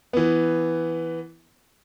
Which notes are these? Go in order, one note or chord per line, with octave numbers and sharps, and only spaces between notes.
E3 B3